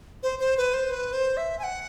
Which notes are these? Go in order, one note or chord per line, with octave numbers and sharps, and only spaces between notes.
C5
C5
B4
C5
B4
C5
E5
G#5
F#5